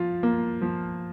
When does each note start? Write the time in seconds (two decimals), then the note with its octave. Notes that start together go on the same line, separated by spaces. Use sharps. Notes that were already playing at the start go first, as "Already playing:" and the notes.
Already playing: F3 F4
0.23 A#3
0.62 F3